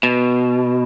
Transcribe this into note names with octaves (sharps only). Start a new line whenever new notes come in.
B2